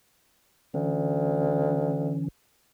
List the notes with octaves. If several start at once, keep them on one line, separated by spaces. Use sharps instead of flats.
D2 D3 E3 C#4